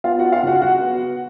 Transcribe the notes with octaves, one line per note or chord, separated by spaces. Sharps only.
B3 F4 F5
F#4 F#5
D#4
F4 F5
C#3 F#4 F#5
F#3 F#4 F#5
B3